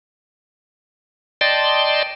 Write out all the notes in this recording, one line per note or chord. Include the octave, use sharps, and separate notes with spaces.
D5 D#5 G5 A5 C6